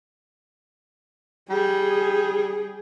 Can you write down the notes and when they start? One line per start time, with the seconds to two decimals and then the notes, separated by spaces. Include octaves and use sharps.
1.50 G3 G#4